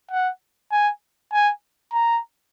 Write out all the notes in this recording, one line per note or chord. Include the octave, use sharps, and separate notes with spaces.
F#5
G#5
G#5
A#5